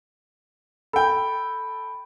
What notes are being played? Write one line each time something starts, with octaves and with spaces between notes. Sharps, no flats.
A4 G5 B5